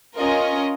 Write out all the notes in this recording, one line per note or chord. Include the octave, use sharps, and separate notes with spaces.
C#4 F4 A#4 D#5